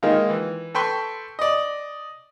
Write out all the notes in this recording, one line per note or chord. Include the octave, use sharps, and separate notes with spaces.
D#3 G#3 A#3 D#4 F4
E3
A4 B4 G5 C6 C#6
D5 D#5